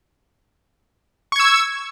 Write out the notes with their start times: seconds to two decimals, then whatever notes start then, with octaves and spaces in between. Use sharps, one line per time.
1.32 C#6
1.36 G#6
1.40 E6